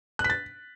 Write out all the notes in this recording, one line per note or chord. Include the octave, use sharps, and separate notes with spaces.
F#6
B6
A6